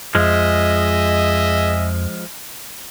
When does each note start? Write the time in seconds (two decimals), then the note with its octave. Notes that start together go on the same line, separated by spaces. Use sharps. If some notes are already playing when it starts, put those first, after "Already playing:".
0.15 F2 F3 G#3 G#4 D#5 E5